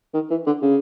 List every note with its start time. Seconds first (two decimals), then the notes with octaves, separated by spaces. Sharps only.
0.14 D#3
0.30 E3
0.46 D3
0.62 C#3